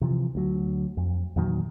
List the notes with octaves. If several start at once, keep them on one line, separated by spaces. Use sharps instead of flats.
C3 E3 F3
D2 F#3
F2
E2 A#2 D#3 F#3